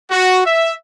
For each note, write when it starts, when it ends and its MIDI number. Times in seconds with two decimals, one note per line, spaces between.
0.10 0.41 66
0.45 0.72 76